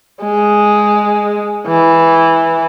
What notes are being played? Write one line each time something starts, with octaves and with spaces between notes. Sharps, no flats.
G#3
E3